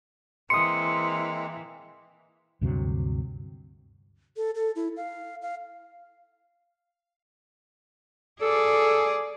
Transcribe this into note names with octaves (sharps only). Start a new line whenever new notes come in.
E3 G#3 A#3 C4 C6 D#6 C#7
D2 G2 C3 F#3
A4
A4
E4
F5
F5
G#4 A4 D5